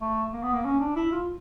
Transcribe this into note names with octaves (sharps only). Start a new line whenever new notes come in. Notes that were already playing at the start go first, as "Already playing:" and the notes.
A3
A#3
B3
A#3
C#4
D4
E4
F4